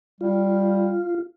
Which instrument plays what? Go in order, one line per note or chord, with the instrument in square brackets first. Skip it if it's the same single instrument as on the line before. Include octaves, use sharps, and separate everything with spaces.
[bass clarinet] G3 [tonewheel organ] F4